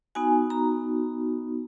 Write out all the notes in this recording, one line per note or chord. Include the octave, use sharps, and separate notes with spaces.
B3 D#4 F#4 G#5
A#5